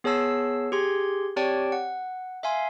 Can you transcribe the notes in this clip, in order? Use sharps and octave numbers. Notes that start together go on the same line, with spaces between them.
B3 G#4 C#5 A5 E6 C7
G4 G#4 C6 G#6
C4 G4 C#5 D5 G5 A5
F#5
E5 F5 G#5 C6